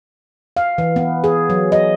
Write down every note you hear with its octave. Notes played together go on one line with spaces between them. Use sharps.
F5
E3
B3
G#4
F#3
D#5